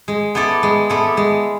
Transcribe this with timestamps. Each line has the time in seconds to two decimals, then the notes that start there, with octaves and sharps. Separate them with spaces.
0.08 G#3
0.35 B3 E4 A4 D5
0.63 G#3
0.90 B3 E4 A4 D5
1.17 G#3